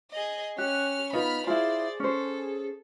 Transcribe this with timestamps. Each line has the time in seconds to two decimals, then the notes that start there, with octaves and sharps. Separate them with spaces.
0.11 G#4 D#5
0.58 C#4 G4 F6 F#6
1.13 B2 D#4 F4 B4 B5 F6
1.47 E4 F4 G#4 C5 D5
2.00 C#4 A4 C5